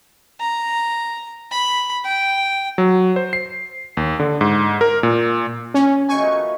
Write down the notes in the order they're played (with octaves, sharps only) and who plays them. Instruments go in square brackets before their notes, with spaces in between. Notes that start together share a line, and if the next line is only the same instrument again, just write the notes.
[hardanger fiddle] A#5
B5
G5
[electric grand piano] F#3
C5
C7
D#2
D3
G#2
A#4
A#2
[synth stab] C#4
[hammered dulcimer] B2 D#3 A3 [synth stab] G#5 C#6
[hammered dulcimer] F3 D#4 B4